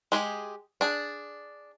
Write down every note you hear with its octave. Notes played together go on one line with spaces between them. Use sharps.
G#3 G4 G#4
D4 G#4